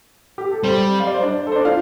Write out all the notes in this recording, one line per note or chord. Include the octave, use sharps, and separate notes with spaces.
G4
A4
G3 C4 C5
F5
D5
C5
D4 D5
A4
C5
D4 D5
F4 F5